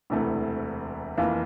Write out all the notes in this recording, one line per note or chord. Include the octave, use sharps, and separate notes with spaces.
E1 D2 C3 E3 A3
F1 F2 E3 A#3 F4